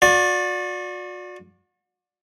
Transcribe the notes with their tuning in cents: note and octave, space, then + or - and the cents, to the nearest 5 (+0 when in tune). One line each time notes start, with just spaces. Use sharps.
F#4 -40 D5 +0